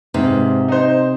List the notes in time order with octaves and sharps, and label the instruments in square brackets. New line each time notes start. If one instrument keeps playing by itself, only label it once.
[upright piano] G#2 [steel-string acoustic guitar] C3
[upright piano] D#4 C5